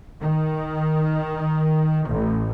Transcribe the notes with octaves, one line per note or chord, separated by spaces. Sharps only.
D#3
A1